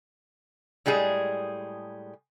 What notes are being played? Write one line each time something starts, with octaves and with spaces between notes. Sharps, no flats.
A2 G3 G#3 G#4